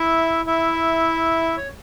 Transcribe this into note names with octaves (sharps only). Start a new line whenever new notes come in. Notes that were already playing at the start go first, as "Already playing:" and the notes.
Already playing: E4 E5
E4 E5
C#5